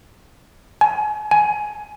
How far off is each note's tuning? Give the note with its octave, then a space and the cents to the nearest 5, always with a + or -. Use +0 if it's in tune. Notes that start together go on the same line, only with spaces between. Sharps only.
G#5 +30
G#5 +15